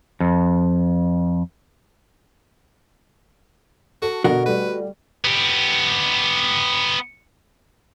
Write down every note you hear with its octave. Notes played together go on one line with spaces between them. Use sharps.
F2
F#4 A4
B2 D3 F#4 A#4 D#5 F#5
G3 A3 B4
B3 G4